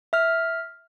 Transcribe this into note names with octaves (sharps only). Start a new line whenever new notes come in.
E5 F6